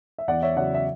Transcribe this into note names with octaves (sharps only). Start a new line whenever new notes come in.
E5
E2 D5 F#5
C#5 E5
C#3 F#3 D5 F#5
E5